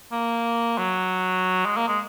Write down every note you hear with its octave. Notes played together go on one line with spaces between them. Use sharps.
A#3
F#3
G#3
A#3
G#3